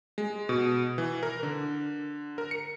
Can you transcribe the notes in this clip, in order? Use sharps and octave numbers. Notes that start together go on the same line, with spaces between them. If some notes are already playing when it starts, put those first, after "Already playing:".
G#3
B2
E3
A#4
D3
A#4
C#7